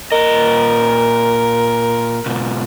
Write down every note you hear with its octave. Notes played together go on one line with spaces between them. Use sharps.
A#2 A#4 D#5
G#2 B2